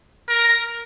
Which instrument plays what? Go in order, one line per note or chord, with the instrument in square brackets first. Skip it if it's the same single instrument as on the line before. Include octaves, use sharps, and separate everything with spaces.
[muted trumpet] A#4